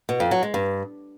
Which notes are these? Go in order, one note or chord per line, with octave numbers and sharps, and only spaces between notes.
B2
F2
F#3
G#3
G2